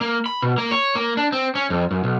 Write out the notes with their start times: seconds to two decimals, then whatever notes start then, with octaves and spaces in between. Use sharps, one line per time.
0.01 A#3
0.26 B5
0.42 B2
0.58 A#3
0.71 C#5
0.95 A#3
1.17 D4
1.32 C4
1.55 C#4
1.70 F2
1.91 F#2
2.04 B1